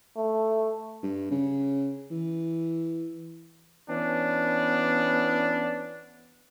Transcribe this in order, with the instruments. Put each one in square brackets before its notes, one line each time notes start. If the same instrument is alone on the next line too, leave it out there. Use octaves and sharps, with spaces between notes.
[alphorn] A3
[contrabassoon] G2
C#3
E3
[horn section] E3 B3 C#4 D4